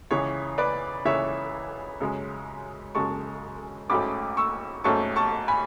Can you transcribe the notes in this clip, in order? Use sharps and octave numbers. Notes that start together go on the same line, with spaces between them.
C#2 C#3 E3 C#5
B4 D5
C#2 C#3 E3 C#5 E5
F#2 C#3 G#3
F#2 C#3 G#3 A5 C#6
A1 G#2 F#3 A3 C#4 B5 D6
C#6 E6
A1 G#2 F#3 A3 C#4 A5 C#6
A5 C#6
G#5 B5